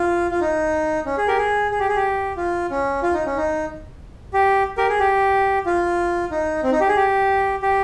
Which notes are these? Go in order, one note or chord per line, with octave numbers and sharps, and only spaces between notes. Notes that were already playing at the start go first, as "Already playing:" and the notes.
Already playing: F4
F4
D#4
C#4
G#4
G4 A#4
G#4
G#4
G4
G#4
G4
F4
C#4
F4
D#4
C#4
D#4
G4
G4 A#4
G#4
G4
F4
D#4
C4
D#4
G4
G#4
G4
G4